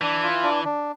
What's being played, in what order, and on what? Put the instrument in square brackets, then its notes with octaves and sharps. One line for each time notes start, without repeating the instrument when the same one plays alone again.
[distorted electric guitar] E3 [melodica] D4
[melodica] F4
D4
D4